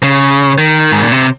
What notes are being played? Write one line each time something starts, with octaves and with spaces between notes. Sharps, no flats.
C#3
D#3
G#2
A#2
C3